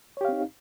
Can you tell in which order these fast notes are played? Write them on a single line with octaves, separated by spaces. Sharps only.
C#5 G4 F5 C4 D#4